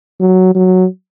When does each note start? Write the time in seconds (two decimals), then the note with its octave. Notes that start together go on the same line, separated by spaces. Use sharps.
0.20 F#3
0.55 F#3